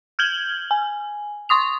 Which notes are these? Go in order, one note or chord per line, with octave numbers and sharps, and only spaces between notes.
F6 G6 G#6 F#7 G7
G#5
C6 C#6 D#6 F7